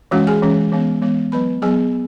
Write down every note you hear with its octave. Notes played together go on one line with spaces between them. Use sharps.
E3 G#3 C#4 F#4 F#5
G#4 G#5
E3 G#3 C#4
E3 G#3 B3
E3 G#3 B3
F#3 B3 B4 B5
F#3 B3 G#4 G#5